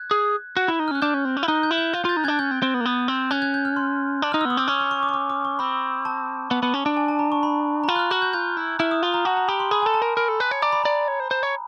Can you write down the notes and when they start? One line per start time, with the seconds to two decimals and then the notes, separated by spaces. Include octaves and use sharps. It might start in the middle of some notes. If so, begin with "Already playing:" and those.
Already playing: F#6 G#6
0.11 G#4
0.57 F#4
0.68 E4
0.79 D#4
0.88 F6
0.91 C#4 F#6
1.02 D4 G6
1.14 C#4
1.25 C4
1.37 C#4
1.43 E4
1.48 D#4 F#6
1.63 G6
1.71 E4
1.78 G6
1.93 F4 G6
2.05 F4 G6 A6
2.16 D#4
2.24 C#4 D4 F#6 G#6
2.39 C#4 G6
2.51 C4
2.62 C4
2.74 B3
2.80 A#3
2.85 B3
3.08 C4
3.31 C#4 F#6 G#6
3.42 F#6 G#6
3.54 G6
3.65 F6
3.76 C6
4.22 D4
4.32 D#4 F6
4.41 E6
4.45 B3
4.50 D#6
4.57 C4 D6
4.68 C#4 C#6
4.80 C#6
4.91 C#6
5.03 D6
5.09 C#6
5.14 D6
5.30 D6
5.45 C#6
5.59 C4 B5
6.05 A5
6.51 B3
6.63 B3
6.74 C#4
6.86 D4
6.97 G#5
7.08 A5
7.19 A#5
7.32 C#6
7.43 B5
7.84 A#5
7.88 F4 B5
7.96 F#6
7.99 F6
8.11 F#4 F#6
8.22 G6
8.33 F4 G6
8.57 E4
8.79 E4 F6
8.91 D#6
9.03 F4
9.14 A#5
9.25 F#4 A5
9.37 A#5
9.48 G4 B5
9.60 C6
9.71 G#4 B5
9.82 G#5
9.86 A4
9.94 A5
10.02 A#4
10.17 A#4 B5
10.28 A4
10.40 B4
10.51 C#5
10.62 D5 A#5
10.72 B5
10.83 D5 A#5
11.08 C#5
11.20 C5
11.31 C5
11.43 C#5